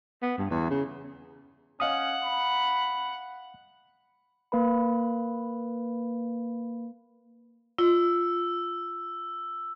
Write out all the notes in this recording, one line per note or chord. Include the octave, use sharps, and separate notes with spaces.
B3
G2
E2
C#3
C#4 D#5 F5 F#5 D#6
B5
A#3 B4 B5
F4 E6